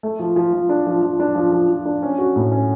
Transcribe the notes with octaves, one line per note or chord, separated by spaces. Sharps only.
A3
F3
F3
F3
D4
F3
F3
D4
F3
F3
F3
D4
C#4
F#4
A2
C#4